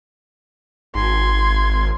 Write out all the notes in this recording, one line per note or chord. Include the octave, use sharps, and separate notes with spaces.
G#1 C6 G#6